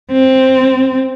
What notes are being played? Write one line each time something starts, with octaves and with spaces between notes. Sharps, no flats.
C4